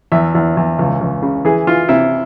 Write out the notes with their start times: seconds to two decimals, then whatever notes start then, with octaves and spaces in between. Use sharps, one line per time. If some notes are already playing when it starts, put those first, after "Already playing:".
0.12 E2 E5
0.35 E2
0.57 E2
0.79 C#2
1.01 C#2
1.22 C#3
1.45 E3 G#4
1.67 E3 F4
1.89 C3 E4